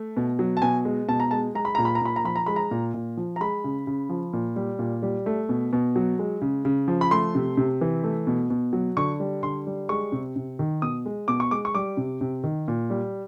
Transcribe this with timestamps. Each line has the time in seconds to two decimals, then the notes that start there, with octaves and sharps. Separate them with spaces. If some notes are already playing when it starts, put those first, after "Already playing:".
Already playing: A3
0.17 B2
0.39 F#3
0.57 A5
0.62 B2 G#5
0.85 G#3
1.09 B2 A5
1.20 A#5
1.31 G#3 A5
1.55 G#3 A#5
1.65 B5
1.75 A#2 A#5
1.85 B5
1.95 A#5
2.01 A#2 B5
2.16 A#5
2.24 F3 B5
2.36 A#5
2.46 G#3 B5
2.56 A#5
2.71 A#2
2.94 A#2
3.17 F3
3.36 A#5
3.41 G#3 B5
3.64 C#3
3.87 C#3
4.09 F3
4.33 A#2
4.56 G3
4.79 A#2
5.02 G3
5.26 A3
5.49 B2
5.73 B2
5.96 F#3
6.19 G#3
6.42 C#3
6.65 C#3
6.88 F3
7.01 B5
7.11 A3 C6
7.35 C3
7.57 C3
7.81 E3
8.04 A3
8.27 B2
8.50 B2
8.73 F#3
8.97 D3 C#6
9.20 G3
9.43 D3 C6
9.67 G3
9.89 G#3 C#6
10.12 C3
10.36 C3
10.59 D#3
10.82 B2 D#6
11.06 G#3
11.28 B2 D6
11.40 C#6
11.51 G#3 D6
11.65 C#6
11.75 G3 D6
11.97 C3
12.21 C3
12.44 D#3
12.68 A#2
12.90 G3